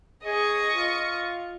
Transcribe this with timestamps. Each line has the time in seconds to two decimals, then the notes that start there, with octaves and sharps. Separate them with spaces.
0.23 G#4 D#5 C#6
0.71 F4